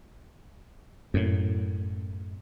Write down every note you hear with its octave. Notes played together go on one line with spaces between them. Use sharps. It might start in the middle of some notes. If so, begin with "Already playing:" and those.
F#2 A2